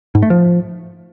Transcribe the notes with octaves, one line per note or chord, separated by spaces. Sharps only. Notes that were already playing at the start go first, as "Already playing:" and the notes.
G#2
A3
F3